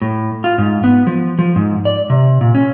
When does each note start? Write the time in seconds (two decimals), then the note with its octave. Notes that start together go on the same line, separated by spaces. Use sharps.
0.02 A2
0.44 F4
0.58 G#2
0.84 B3
1.07 F3
1.39 F3
1.56 G#2
1.85 D5
2.10 C3
2.41 A#2
2.55 C#4